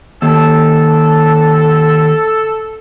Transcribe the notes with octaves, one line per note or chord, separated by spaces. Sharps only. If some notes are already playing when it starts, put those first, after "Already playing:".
D#2 A4